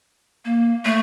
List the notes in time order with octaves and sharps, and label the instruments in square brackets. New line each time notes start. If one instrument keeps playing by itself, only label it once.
[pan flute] A#3
A3